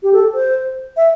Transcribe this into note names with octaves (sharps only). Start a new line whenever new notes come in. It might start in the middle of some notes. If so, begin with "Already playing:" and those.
G4
A4
C5
E5